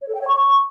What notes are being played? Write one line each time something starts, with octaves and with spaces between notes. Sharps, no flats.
C#5
A4
G5
C#5
C#6